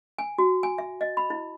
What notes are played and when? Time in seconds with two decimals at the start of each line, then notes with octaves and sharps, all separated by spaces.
0.18 G#5
0.38 F#4
0.63 G#5
0.78 E5
1.01 D#5
1.17 B5
1.30 E4